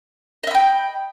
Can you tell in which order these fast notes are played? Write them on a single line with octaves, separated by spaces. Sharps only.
D#5 E5 B5 G5